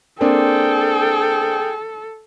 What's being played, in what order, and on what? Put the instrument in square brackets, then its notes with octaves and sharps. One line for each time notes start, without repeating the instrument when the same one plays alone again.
[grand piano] A#3 C4 D4 [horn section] G#4 G5 [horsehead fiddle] A4